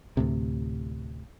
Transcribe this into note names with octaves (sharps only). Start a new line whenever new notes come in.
D2 A2 C3